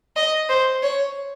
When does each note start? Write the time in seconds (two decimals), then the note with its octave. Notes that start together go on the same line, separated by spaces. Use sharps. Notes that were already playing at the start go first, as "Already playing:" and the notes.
0.16 D#5
0.49 C5
0.83 C#5